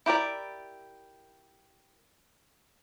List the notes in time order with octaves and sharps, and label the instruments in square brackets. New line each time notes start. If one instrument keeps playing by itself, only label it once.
[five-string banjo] E4 G4 A#4 D5